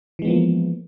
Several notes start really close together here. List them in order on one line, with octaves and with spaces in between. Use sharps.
E3 G#3 B3 F3 A#3